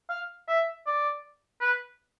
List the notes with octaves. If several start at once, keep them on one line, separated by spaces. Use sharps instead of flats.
F5
E5
D5
B4